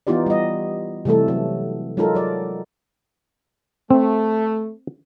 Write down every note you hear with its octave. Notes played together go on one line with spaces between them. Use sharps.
E3 B3 D#4 F4 G4 D5
G3 D#5
C3 E3 G3 A3 A4
F#3
F#3 G#3 D#4 F4 A4 A#4
F#3 D5
A3 C4